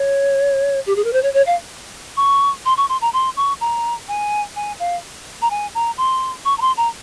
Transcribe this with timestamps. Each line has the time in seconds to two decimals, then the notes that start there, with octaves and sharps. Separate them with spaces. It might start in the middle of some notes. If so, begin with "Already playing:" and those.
Already playing: C#5
0.86 G4
0.96 G#4
1.04 A#4
1.13 C5
1.23 C#5
1.34 C#5
1.47 F5
2.17 C#6
2.65 C6
2.77 C#6
2.89 C6
3.01 A#5
3.13 C6
3.37 C#6
3.61 A#5
4.08 G#5
4.56 G#5
4.80 F5
5.42 A#5
5.50 G#5
5.75 A#5
5.98 C6
6.45 C#6
6.58 A#5
6.61 C6
6.77 A#5